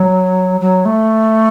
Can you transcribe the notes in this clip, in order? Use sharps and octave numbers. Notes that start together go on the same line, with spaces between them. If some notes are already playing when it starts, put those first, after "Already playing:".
Already playing: F#3
F#3
A3